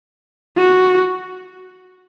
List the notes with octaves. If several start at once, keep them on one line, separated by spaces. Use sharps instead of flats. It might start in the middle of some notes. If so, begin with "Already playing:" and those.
F#4